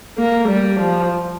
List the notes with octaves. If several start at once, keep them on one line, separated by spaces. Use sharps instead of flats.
A#3
G3
F3